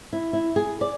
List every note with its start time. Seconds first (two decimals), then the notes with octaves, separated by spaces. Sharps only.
0.13 E4
0.33 E4
0.56 G#4
0.81 D5